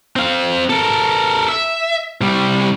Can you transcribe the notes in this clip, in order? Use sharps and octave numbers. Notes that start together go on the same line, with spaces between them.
C4 F5
A4 A#4
E5
C2 G3